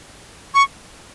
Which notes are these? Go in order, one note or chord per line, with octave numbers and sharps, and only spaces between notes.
C#6